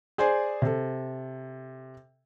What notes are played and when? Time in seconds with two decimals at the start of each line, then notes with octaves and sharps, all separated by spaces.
0.18 G#4 C5 D5 G#5
0.62 C3 A4